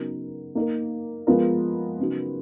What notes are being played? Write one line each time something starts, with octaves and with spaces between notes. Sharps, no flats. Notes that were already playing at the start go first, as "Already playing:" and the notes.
Already playing: C#3 F#3 B3 D#4 A#4
A#3 D#4 A#4
F3 G#3 B3 F4 A#4
C#3 F#3 B3 D#4 F#4